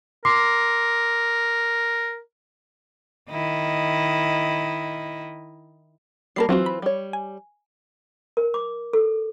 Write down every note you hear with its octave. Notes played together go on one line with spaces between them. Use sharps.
A#4 C6 D6 C7
D#3 E4 D#5
G3 A#3 A#4 A5 B5 C7
E3 F#3 C4 F4 F#4
B5
G3 C#5
G#5
A#4
D6
A4